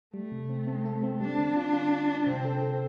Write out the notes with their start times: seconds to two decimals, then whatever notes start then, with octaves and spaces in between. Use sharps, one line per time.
0.14 G3 A3
0.32 C3
0.50 C4
0.67 C4
0.85 A4
1.03 C4
1.21 G3 D4
1.38 D3
1.56 F4
1.73 F4
1.92 F4
2.09 F4
2.27 C3 C4
2.45 A4
2.62 A4